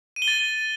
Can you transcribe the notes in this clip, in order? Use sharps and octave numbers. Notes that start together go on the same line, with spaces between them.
D#7
G7
A6